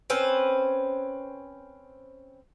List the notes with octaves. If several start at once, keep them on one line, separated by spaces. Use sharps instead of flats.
C4 C#4 B4 C5